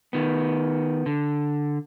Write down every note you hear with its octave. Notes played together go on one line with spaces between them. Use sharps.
D#3 B3
D3